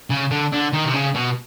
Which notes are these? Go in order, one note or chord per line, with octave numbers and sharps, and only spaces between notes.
C#3
D3
D3
D#3
C3
C#3
B2